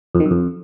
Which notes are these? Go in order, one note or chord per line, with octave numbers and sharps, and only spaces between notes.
F2
D#3
F#2
F2